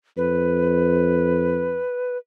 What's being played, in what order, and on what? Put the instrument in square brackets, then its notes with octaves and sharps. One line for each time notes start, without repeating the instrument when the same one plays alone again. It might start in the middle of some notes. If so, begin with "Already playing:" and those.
[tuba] F2 [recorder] B4